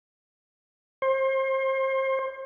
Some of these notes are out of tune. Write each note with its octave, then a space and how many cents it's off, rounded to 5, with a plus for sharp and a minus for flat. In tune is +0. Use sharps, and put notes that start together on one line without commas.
C5 +30